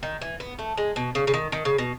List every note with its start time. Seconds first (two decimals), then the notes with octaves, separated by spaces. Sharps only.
0.03 D#3
0.21 E3
0.40 B3
0.59 A3
0.78 G#3
0.96 B2
1.15 C#3
1.27 C#3
1.34 D#3
1.52 D#3
1.65 C#3
1.78 B2